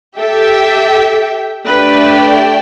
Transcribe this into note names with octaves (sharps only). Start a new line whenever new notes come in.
G4 A4 E5 G5
A3 D4 G4 B4 D5 G5